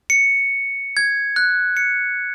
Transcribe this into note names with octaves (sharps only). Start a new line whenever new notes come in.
C#7
G#6
F#6
C#7